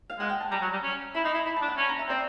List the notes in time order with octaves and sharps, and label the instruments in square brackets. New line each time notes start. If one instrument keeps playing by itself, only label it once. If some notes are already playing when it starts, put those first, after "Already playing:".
[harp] F5
[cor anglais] G#3 [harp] F#5
[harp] G5
A5
[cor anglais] G3 [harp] A#5
[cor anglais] F#3
G3
C#4
[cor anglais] E4 [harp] B5
[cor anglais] D#4 [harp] C6
[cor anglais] E4 [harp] B5
[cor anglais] E4 [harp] B5
[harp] A5
[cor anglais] D4
[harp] F#5
[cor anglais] C#4 [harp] A5
[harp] A#5
E5
[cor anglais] C4 [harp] D5